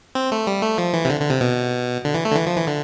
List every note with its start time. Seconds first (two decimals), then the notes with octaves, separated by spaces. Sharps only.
0.15 C4
0.32 A3
0.47 G3
0.63 A3
0.78 F3
0.93 E3
1.05 C3
1.09 D3
1.20 D3
1.30 C3
1.41 B2
2.05 D3
2.14 E3
2.25 A3
2.32 D3
2.35 E3
2.46 F3
2.57 E3
2.67 D3